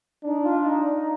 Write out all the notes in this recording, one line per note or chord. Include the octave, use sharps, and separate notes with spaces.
D4 D#4
F4
D#4